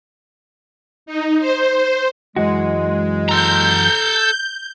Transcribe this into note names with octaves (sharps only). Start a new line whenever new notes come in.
D#4
C5
F#2 E3 G#3 F#4
A4 A#5 G6